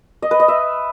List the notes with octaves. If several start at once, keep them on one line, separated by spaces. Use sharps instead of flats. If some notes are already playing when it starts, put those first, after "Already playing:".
D#5
B4
D#5
E5